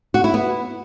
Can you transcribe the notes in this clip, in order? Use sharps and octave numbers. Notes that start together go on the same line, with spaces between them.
F#4
E4
B3